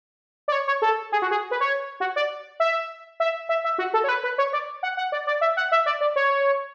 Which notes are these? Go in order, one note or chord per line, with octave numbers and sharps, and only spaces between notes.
D5
C#5
C#5
A4
G#4
F#4
G#4
B4
C#5
F#4
D5
E5
E5
E5
E5
F#4
A4
C#5
B4
B4
C#5
D5
F#5
F#5
D5
D5
E5
F#5
E5
D5
D5
C#5